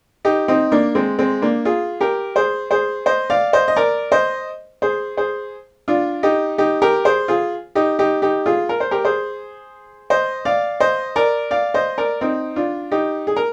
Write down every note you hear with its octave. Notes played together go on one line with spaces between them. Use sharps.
D#4 G4
C4 D#4
A#3 D4
G#3 C4
G#3 C4
A#3 D4
F4 G#4
G4 A#4
G#4 C5
G#4 C5
C5 D#5
D5 F5
C5 D#5
D#5
A#4 D5
C5 D#5
G#4 C5
G#4 C5
D4 F4
D#4 G4
D#4 G4
G4 A#4
G#4 C5
F4 G#4
D#4 G4
D#4 G4
D#4 G4
F4 G#4
A#4
C5
G4 A#4
G#4 C5
C5 D#5
D5 F5
C5 D#5
A#4 D5
D5 F5
C5 D#5
A#4 D5
C4 D#4
D4 F4
D#4 G4
G#4
A#4